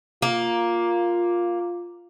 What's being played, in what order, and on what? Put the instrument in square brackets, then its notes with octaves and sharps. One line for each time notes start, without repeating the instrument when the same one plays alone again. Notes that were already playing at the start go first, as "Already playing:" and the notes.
[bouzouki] A#3 [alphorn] F4